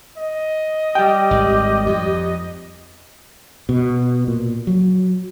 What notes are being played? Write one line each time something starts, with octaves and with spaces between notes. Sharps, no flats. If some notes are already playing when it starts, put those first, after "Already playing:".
D#5
G3 G4 G5
G#1
F2
B2
A#2
F#3